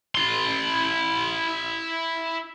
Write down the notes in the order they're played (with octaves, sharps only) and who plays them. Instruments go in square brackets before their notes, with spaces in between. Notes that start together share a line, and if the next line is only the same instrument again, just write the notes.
[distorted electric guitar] E4 C6